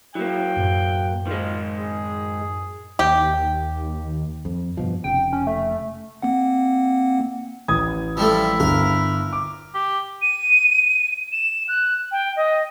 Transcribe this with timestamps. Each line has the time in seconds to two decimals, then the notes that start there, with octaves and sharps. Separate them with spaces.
0.15 F#3 A#3 E4 F#4 G5
0.56 F#2 A2
1.27 D#3 G#3 F4
1.77 G#4
2.99 D#2 G4
4.45 F2
4.77 G2 B2 F3
5.04 F1 C#3 G5
5.33 C#4
5.47 A3
6.22 A#3 C4 F#5
7.68 A1 D#6 G#6
8.17 F3 G3 A3 E4
8.60 G1 A#4
9.33 D6
9.75 G4
10.22 D#7
11.32 E7
11.68 F#6
12.12 G5
12.36 D#5